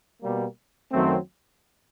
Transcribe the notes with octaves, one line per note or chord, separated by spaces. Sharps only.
B2 G3 A#3
F#2 D#3 F#3 A3 C4